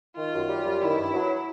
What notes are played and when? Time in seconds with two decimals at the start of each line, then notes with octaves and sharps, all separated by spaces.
0.16 D#3 F4
0.33 F#2
0.49 G3
0.65 F#2
0.81 D#3 E4
0.97 G2
1.14 F#3